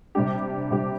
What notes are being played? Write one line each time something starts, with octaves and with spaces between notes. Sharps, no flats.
C3 G3 D4 G4
C3 G3 D4 G4